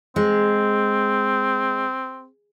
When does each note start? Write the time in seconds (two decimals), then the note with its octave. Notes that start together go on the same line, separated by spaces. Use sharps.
0.16 G#3 C4